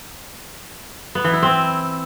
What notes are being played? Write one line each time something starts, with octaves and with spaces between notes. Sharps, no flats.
B3
E3
E4
C4